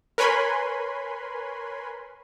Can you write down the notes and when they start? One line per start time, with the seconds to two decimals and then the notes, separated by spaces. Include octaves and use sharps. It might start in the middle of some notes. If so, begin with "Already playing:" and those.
0.18 A#4 B4 C#5 G#5 B5 C6